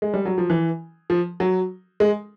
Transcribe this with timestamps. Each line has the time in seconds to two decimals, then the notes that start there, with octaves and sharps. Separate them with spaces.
0.02 G#3
0.14 G3
0.26 F#3
0.38 F3
0.50 E3
1.10 F3
1.40 F#3
2.00 G#3